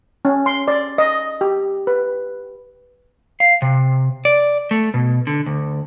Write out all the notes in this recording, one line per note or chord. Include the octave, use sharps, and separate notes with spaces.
C#4
C6
D5
D#5
G4
B4
F5
C3
D5
A3
B2
D3
D2